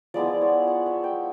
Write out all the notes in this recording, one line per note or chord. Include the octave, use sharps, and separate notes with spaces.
F3 G#3 B3 E4 D5
C#5
F#5
E5
G5